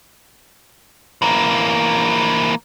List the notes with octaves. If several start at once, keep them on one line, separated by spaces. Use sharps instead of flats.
E3 A#3